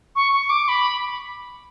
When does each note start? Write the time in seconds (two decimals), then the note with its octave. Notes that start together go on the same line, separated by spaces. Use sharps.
0.16 C#6
0.32 C#6
0.50 D6
0.68 B5